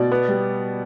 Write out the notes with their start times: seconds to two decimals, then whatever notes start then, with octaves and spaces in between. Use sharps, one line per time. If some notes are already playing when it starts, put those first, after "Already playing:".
Already playing: B2 D5
0.12 B3
0.28 G3